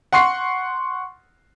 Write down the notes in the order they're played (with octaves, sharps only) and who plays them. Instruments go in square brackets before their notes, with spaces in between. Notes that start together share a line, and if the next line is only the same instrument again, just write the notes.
[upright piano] F#5 C6 C#6 C7